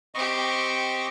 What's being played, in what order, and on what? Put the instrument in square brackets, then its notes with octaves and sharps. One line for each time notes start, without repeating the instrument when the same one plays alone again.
[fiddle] C4 G4 [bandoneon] D#5 C#6